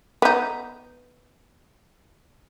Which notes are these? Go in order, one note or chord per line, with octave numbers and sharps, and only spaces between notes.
B3 D#4